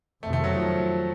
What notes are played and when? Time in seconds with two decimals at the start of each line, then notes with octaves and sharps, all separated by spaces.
0.22 F2 C3 D#3 A3
0.33 A3
0.44 F#3
0.55 F3